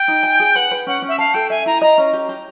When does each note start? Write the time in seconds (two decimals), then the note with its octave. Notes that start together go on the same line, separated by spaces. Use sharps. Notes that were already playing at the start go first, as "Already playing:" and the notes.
Already playing: G5
0.08 D#4
0.23 G#5
0.40 G#4
0.55 B4 F#5
0.71 B4
0.87 C#4 F#5
1.02 C#4
1.08 E5
1.18 F5 A5
1.34 A4 G5
1.50 E5 G#5
1.66 E4 A#5
1.81 D#5 A#5
1.98 C#4
2.13 G4
2.29 G4